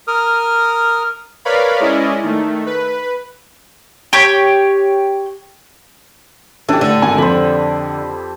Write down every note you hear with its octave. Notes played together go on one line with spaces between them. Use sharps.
A#4 D#6 F6
A#4 B4 C#5 D5 F5 B5
G#3 C#4 E4 D5 D#5
D#3 A3
B4
G4 C#5
E3 C#4 D4 G4 A4 C#5
A2 D3
G#1 A#3 G#5
F2 C4 C5 B5